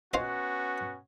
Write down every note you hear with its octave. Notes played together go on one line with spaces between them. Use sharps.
B3 C#4 F4 F#4 C5 D#5